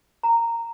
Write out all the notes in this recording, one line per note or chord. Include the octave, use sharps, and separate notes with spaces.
A#5